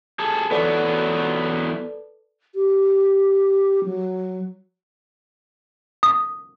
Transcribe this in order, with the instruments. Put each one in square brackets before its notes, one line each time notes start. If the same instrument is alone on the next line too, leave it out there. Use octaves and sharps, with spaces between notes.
[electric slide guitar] G#4 A4
[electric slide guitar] E2 F#3 B3 [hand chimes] A4 B4 D5
[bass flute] G4
F#3
[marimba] D#6